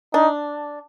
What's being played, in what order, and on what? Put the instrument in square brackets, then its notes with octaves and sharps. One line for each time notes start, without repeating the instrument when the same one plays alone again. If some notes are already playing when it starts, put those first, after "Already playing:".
[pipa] D4 [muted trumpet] D#4